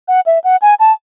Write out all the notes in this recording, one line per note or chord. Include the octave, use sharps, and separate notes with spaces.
F#5
E5
F#5
G#5
A5